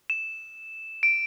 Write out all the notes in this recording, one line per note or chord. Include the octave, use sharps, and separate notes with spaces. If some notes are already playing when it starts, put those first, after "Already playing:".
E7
D7